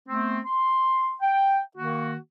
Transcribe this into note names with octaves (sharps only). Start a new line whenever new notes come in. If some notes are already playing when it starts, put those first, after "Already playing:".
A3 B3 C4
C6
G5
D#3 A#3 F#4